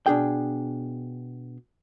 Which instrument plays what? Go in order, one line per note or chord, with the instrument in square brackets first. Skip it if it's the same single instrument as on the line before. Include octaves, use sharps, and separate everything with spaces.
[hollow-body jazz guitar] B2 D4 G#4 G5